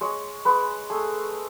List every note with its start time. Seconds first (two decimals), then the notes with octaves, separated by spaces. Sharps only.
0.01 G#3 C#5
0.45 G#3 B4
0.90 A3 G#4